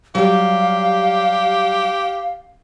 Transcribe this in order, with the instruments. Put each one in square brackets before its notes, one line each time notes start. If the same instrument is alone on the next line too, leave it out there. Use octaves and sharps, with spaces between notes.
[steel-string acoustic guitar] F#3 G3 [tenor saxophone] G4 [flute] F5